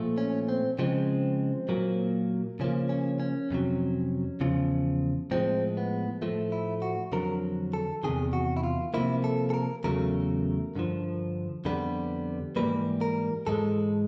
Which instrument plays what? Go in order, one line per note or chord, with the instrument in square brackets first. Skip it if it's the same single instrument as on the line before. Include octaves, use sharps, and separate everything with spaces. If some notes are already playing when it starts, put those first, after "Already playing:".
Already playing: [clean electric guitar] A#2 F3 A3
C#4
C4
C#3 F3 G#3 C4
A#2 F#3 A#3
C#3 F3 A#3 C#4
C#4
C#4
F2 C3 D#3 F#3
E2 C#3 F3
A2 F3 G#3 C4
B3
A2 F3 A3
E4
F#4
F2 D3 F#3 A#4
A4
E2 C3 D#3 G#4
F#4
E4
F4
C3 F3 A#3 E4
A4
A4
A#4
E2 C#3 F#3 A3 A#4
G2 D3 F3
F2 D3 G3 B3 B4
G#2 E3 G3 A#3 B4
A#4
G#2 E3 G#3 A4